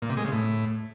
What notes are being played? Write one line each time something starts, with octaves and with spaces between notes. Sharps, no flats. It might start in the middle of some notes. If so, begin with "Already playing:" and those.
A#2
C3
G#3
C#3
A2